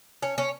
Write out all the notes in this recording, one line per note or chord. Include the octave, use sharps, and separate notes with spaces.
C#4
C#4